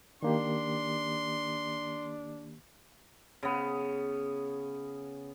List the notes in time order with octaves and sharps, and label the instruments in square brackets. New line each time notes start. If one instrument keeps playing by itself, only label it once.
[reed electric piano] D#3 A#3 G4 [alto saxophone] D4 [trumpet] C6
[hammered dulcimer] C#3 B3